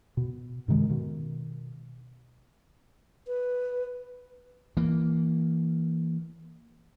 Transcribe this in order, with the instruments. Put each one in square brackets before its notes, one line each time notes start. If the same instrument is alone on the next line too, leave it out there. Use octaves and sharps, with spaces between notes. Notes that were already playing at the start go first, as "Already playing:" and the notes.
[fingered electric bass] B2
G2 C3 D#3 G#3
B2 D#3
[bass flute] B4
[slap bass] E3 A#3